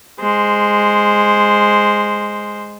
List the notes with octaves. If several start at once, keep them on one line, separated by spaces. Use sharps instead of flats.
G#3 C5